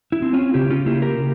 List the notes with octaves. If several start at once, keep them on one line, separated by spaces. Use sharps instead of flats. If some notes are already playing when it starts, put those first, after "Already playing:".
E4
C4
C#4 F4
C#3 E4 G4
C#4 F4
A#3 E4 G4
G4 A#4
C#3